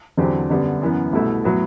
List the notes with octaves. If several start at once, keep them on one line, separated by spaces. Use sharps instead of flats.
E2 D3 F#3 C4 G4
F#2 D3 G3 B3
F#2 E3 B3
C2 B2 A3 E4
A2 F#3 B3 F#4